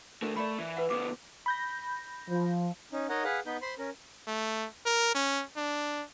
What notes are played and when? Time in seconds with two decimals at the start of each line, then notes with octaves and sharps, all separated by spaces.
0.22 A3 D4 A#4
0.37 A3 D5 B5
0.59 E3
0.77 B4 F#5
0.90 D2 B3 D6
1.46 B5 G6 A#6
2.29 F3
2.92 C#4 D#4
3.09 D#4 A#4 C#5 D#5 F#5
3.24 G#4 B4 F5 F#5
3.46 B3 D#4 B4 G6
3.62 C5 B5 C6
3.78 C#4 A#4
4.27 A3
4.86 A#4
5.15 C#4
5.57 D4